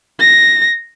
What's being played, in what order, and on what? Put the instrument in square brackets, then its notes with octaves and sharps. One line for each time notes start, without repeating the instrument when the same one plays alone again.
[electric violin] A#6